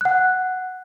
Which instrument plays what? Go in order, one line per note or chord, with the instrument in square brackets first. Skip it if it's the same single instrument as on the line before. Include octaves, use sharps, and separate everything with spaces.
[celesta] F#5 F#6